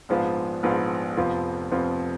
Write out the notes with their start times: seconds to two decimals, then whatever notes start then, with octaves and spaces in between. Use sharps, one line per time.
0.09 A#1 G#2 F3 B3 F4
0.63 A#1 G#2 F3 B3 F4
1.17 F1 F2 F3 B3 F4
1.71 F1 F2 F3 B3 F4